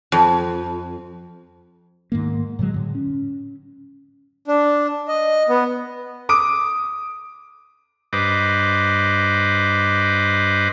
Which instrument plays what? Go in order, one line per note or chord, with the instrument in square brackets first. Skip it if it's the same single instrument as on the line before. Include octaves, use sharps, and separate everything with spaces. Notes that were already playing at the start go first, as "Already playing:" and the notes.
[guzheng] F2
[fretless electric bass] G#2 D#3 A#3
A2 D3 F#3 G#3
A2 D3
C#4
[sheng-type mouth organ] D4
D#5
B3
[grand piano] D6 D#6 D7
[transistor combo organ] G2 B4 C5 D#5 D6